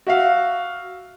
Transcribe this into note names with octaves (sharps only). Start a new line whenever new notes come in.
F#4 E5 F5